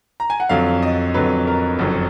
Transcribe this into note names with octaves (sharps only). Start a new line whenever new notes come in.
A#5
G#5
F#5
F2 D3 F#3 F5
D#5
F2 D3 F#3 B4
A#4
F#1 F2 D3 F#3